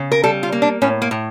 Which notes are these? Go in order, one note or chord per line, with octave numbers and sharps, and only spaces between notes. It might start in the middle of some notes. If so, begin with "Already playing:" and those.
Already playing: C#3
A#4
G3 A4
F4
A#3
D4
A2 C#4
A#3
A2